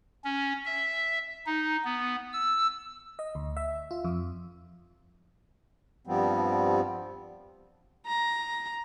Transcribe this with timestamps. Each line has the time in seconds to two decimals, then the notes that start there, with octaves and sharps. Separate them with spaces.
0.25 C#4
0.66 E5
1.46 D#4
1.84 B3
2.33 E6
3.19 D#5
3.35 D2
3.57 E5
3.91 F4
4.05 F2
6.07 G2 F3 G3 B3 C4
8.06 A#5